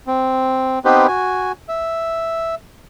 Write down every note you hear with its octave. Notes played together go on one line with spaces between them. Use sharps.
C4
B3 C4 D#4 G4 B4 C5
F#4 G#5
E5